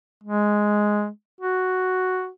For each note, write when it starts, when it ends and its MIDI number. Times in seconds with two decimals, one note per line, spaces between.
0.24 1.08 56
1.41 2.29 66